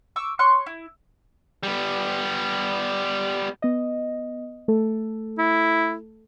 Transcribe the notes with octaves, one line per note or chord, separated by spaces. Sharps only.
C#6 D6 E6
C#5 C6 C#6 F#6
E4
G3 B3
B3 D#5
A3 A4
E4